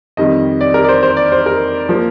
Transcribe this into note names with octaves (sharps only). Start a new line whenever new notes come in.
F2 D#3 G3 D#5
D5
A#4
D5
C5
C5
D5
C5
A#4
F3 A#3